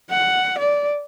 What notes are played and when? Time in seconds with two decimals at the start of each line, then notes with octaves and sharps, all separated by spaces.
0.10 F#5
0.58 D5